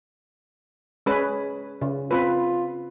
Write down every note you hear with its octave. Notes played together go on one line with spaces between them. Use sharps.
G#3 C#4 B4
C#3
C4 F4 B4